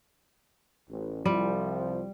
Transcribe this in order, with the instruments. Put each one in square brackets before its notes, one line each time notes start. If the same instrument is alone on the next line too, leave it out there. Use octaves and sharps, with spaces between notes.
[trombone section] A1
[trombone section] C2 F3 [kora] G3